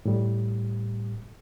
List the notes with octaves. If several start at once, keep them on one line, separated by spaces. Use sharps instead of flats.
A2 G3